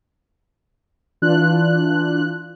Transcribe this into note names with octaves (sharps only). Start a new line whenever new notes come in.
E3 D4 F4 F#6